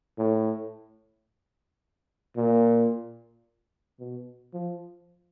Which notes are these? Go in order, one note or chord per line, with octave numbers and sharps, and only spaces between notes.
A2
A#2
B2
F3